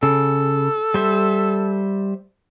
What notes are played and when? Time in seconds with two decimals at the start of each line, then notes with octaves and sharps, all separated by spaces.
0.03 C#3 A4
0.94 G3 C5 E5